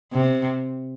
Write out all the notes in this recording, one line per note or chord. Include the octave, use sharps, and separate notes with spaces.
C3